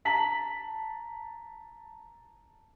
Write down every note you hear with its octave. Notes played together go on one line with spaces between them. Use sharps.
A5 A#5 B6 F#7